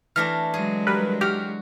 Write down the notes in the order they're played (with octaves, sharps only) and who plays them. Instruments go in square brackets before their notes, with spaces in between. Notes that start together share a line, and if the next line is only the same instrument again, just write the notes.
[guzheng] E3 A3 D4 [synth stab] F6 A#6
[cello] F#3 G#3 [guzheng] G#4
[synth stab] G3 A#4 B4
[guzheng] F#4 [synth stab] G4 F6